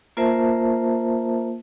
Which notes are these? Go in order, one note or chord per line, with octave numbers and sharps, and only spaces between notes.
A#3 F4 A#4 C5 E5 A5